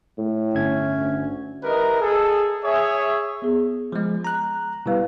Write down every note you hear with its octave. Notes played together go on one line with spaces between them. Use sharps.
A2
G1 C#4 E5 G#6
D2
G3 D#4 E4 A#4 B4 D#5
G#4 A4
G#4 C#5 E5
B3 G#4
F3 G#3
A#5 F#6
B2 G3 E4 B4 F5